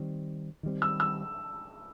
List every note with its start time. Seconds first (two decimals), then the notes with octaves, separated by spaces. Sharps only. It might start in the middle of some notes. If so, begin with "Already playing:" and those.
Already playing: D#3 G3 C4
0.63 D#3 G3 C4
0.82 E6
1.00 E6